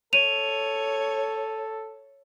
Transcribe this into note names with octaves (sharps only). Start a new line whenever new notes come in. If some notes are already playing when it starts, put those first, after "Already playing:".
A4 C#5 D#7 F7